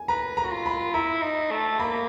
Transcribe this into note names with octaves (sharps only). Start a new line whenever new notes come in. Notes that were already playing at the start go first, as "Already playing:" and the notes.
Already playing: G#5
B4 A#5
A#5
F#4
F4
B5
E4 A#5
D#4
A3
A#3 B5